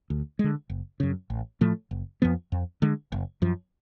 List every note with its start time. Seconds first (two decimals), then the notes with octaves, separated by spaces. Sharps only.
0.10 D2
0.39 D3 G#3
0.70 F#1
1.00 F#2 C#3
1.30 A1
1.61 A2 F3 A3
1.91 F#1
2.22 F2 F3 B3
2.52 F2
2.82 D3 G#3
3.12 F#1
3.42 F#2 F3